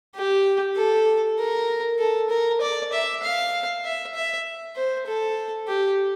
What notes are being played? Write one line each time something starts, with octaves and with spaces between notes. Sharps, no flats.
G4
A4
A#4
A4
A#4
D5
E5
F5
E5
E5
C5
A4
G4